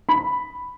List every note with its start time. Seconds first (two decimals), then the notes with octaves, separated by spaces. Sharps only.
0.09 B5